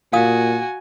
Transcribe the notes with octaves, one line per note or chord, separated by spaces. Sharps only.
A#2 F#4 F5 G#5 D#6